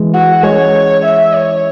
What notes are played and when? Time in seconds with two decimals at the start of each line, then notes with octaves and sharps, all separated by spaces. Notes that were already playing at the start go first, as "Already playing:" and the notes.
Already playing: E3 G#3
0.13 F#4
0.43 G#3 C#4 C#5
1.05 E5
1.35 C#5